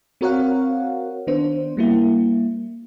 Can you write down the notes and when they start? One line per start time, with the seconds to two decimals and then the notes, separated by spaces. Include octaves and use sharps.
0.21 C4 F#4 A#4 C#5 F5 F#5
1.27 D#3 B3 D4 C5
1.77 G3 A#3 E4